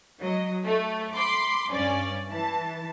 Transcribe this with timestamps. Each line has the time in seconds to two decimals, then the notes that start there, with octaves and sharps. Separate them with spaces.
0.20 F#3 D#5
0.65 A3
1.13 B5 C6 D6
1.71 G2 C#4 D5
2.29 E3 A5